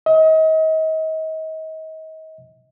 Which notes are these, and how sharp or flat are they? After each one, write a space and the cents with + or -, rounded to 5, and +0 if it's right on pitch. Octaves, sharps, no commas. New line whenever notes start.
D#5 +35